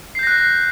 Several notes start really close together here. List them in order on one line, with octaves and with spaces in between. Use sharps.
C7 G6 A#6 F#6